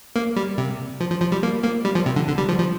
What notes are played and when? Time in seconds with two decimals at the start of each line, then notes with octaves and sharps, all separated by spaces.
0.16 A#3
0.36 G3
0.58 C3
1.00 F3
1.11 F3
1.21 F3
1.32 G3
1.43 A#3
1.64 A#3
1.85 G3
1.95 F3
2.06 C3
2.16 D3
2.27 D3
2.38 G3
2.49 F3
2.59 F3